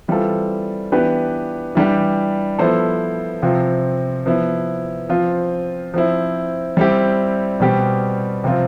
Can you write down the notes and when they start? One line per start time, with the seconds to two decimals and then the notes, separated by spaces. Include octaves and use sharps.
0.08 E3 G3 C4 F4 A4
0.92 E3 B3 D4 G4 B4
1.75 E3 G3 D4 G4
2.59 F3 B3 E4 A4 C5
3.42 C3 F3 C4 F4
4.26 F3 B3 E4
5.09 F3 C4 F4
5.94 F3 C4 E4
6.77 G3 C4 E4 G4
7.60 B2 G3 C4 G4
8.44 C3 F3 C4 F4